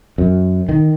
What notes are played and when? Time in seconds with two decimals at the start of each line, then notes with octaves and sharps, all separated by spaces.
0.18 F#2
0.69 D#3